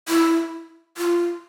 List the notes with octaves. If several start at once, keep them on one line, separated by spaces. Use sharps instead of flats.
E4
F4